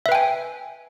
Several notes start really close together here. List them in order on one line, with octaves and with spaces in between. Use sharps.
E5 B4 G5 G#5